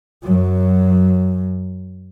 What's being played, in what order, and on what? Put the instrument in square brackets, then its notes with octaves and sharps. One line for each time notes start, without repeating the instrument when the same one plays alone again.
[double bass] F#2 F#3